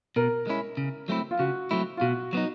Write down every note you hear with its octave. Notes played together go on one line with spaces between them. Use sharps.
B2 A#4
G#3 C#4 E4
C#3
F#3 A3 C4 E4
F4
C#3 F#4
F#3 A3 C4 E4
F4
B2 F#4
F#3 B3 D#4